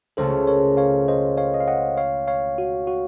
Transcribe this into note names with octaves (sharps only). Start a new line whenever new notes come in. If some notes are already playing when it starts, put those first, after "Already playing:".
C#2 C#3 A3 A4 C5
A#4 C#5
C#5 F5
C5 D#5
C#5 F5
D#5
F5
D#5 F#5
C#5 F5
C#5 F5
F#4
F#4